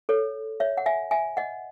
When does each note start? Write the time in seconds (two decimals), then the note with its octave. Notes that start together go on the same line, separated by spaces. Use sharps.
0.09 A4 C#5
0.60 C#5 E5
0.77 F#5
0.86 E5 G#5
1.11 E5 G#5
1.37 D#5 F#5